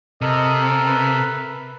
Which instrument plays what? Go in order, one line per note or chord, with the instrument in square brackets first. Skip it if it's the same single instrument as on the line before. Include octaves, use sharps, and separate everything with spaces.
[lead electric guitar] C3 [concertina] A4 A#4 [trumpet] D#5
[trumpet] B4